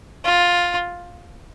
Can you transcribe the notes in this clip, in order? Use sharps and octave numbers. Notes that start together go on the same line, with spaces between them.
F4